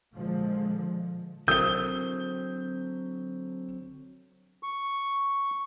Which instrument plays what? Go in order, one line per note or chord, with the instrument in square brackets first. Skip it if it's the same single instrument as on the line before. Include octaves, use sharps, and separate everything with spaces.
[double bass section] A#2 D3 F3 G#3
[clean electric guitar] D3 F#3 C4 [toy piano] E4 A4 A#4 [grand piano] G6 G7
[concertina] C#6